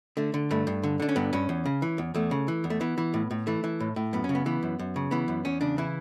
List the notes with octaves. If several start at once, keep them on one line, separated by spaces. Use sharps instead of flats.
D3 A3
D3
G2 A3
G2
D3
D3 D4
C#4
G2 B3
G2 C#4
E2
C#3
E3
E2
E2 A3
C#3
E3
E2
A3
E3 B3
E3
A2
A2
E3 A3
E3
A2
A2
F#2 B3
C#4
C#3
B3
E3 B3
F#2
F#2
C#3
E3 B3
F#2
E2 C#4
C#3 D4
E3 E4